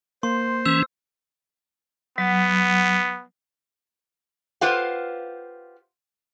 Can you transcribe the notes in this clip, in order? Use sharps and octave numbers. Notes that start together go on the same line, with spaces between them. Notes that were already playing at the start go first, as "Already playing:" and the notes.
A#3 C5 C6
E3 C#4 E6
F#3 B3
F4 G4 B4 C5 F5 F#5